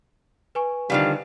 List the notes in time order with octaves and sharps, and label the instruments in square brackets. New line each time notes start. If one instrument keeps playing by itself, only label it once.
[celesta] B4 G#5 C#6
[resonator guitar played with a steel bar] D3 D#3 F3 [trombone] G3 [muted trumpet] F5